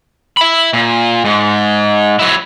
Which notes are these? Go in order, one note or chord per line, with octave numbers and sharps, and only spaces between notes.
E5 B5
A#2
G#2
F#3 E4